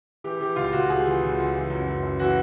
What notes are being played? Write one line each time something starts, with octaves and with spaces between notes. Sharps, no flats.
E3 G4
E3 G4
C#2 F4
C#2 F#4
C#2 G#4
E3
C#2
C#2
E3
F#2
F#2
F#2
E3 F#4